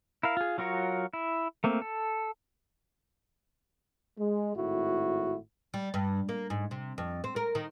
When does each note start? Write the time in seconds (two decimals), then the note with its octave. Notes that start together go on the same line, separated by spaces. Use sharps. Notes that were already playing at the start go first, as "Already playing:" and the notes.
0.23 E4 A#4 F5
0.37 F4 G#4
0.58 F#3 F4 F#4 A#4 C#5
1.13 E4
1.64 A3 A#3 C4
1.82 A4
4.18 G#3
4.55 G#1 A2 E4 F#4
5.74 G3
5.94 G2
6.29 A#3
6.50 G#2
6.71 C3
6.98 F2
7.24 C4
7.36 A#4
7.55 D#3